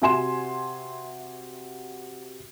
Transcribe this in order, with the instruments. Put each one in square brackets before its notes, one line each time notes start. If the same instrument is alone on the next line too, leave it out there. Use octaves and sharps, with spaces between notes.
[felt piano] C3 F#4 E5 G#5 C6 E7